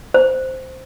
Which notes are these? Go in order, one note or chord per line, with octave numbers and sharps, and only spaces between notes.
C5